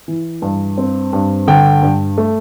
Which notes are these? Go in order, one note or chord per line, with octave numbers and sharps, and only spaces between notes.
E3
G2
C4
G2
D3 G5
G2
A3